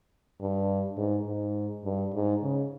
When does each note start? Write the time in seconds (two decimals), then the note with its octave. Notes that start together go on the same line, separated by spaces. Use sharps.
0.41 G2
0.98 G#2
1.27 G#2
1.85 G2
2.14 G#2
2.43 C#3